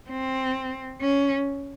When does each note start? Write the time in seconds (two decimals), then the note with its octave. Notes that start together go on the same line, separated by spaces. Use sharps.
0.10 C4
1.00 C#4